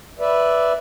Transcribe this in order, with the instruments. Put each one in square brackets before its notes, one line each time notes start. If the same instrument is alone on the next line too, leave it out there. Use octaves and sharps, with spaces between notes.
[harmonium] B4 D5 E5